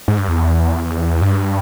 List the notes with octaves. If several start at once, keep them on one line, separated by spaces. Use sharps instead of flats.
G#2
G2
E2
G2